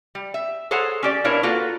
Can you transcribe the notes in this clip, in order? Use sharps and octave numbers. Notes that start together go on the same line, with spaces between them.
G3
E5
G#4 A4 C5 C#5 F#5 A#5
C#4 G4 D5
B2 D4 E4 A#4 C#5 F5
A#3 F4 F#4 A4 B4